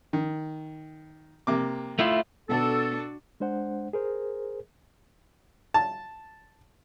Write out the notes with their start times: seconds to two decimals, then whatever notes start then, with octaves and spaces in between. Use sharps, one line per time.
0.13 D#3
1.47 C3 A#3 D6
1.99 A3 E4 F4
2.49 B2 B3 D4 F#4 A4 A5
3.40 G#3 D4 C5 F#5
3.93 G#4 A#4 C5
5.74 A5